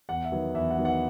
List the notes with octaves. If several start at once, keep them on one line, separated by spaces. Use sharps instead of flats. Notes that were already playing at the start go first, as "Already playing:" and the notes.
E2 F#5
E5
D#3 F#3 B3
E2 E5
F#5
D#3 F#3 B3
F#5